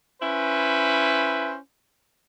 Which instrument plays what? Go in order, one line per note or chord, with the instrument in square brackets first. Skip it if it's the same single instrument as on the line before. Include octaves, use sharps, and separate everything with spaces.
[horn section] C#4 E4 B4 C5